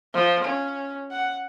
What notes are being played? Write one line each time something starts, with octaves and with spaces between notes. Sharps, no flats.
F3
C#4
F#5